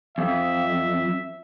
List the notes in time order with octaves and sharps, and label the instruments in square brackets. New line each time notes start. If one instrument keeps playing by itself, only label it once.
[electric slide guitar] F2 [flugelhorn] E5